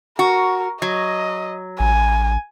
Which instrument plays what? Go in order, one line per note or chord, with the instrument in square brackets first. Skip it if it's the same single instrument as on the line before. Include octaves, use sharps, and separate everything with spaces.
[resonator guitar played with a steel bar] F#4 [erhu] A#4
[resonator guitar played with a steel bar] F#3 [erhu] D#5
[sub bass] A1 [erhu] G#5